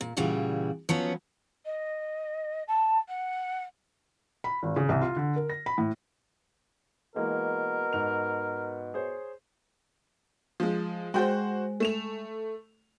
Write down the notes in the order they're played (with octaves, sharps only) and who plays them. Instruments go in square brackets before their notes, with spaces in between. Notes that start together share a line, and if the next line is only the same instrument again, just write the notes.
[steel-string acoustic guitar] A#2
A#2 C#3 E3 G3 F#4
F3 F#3 B3 C#4
[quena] D#5
A5
F#5
[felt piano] B5
G#1
C#3
C2
F4
D3
A#4
A#6
B5
A2
[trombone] B2 [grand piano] E3 G#3 A#3 [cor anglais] A#4
[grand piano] G#2 F7
G#4 C5 C#5
[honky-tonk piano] F3 G#3
[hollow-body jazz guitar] G#3 G5 [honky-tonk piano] F#4 C5
[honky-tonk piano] A3 E7 F7